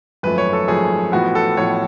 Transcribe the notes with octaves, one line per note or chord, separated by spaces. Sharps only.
G#1 F#2 F3 A3 B4
C#5
A4
G#1 F#2 F3 A3 G#4
A1 A2 F3 B3 F#4
A4
A1 A2 F3 B3 C#5